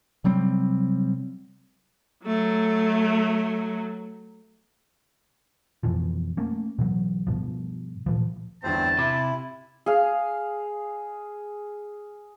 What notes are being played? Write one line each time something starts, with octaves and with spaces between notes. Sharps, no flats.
C3 F#3 G3 C4
F#3 A3
F2 B2 E3 F3
A3 A#3 C#4
B2 E3 F#3
G2 B2 F3
A#2 C#3 E3 F3
G1 E2 G2 C4 C5 A5
C3 E4 D6
G#4 F5